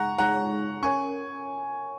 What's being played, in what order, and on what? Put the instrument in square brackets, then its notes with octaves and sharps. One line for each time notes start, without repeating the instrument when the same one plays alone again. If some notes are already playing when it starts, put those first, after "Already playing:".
Already playing: [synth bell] G#3 D#4 G#4 [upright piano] F#5 A#5 C#6
[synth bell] G#3 D#4 G#4 C#5 [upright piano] F#5 A#5
[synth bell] C#4 A#4 C#5 [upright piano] G#5 C#6